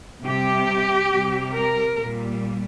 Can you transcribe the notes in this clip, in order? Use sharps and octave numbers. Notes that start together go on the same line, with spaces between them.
C3 G3 G4
C3 G3
A#4
A#2 G3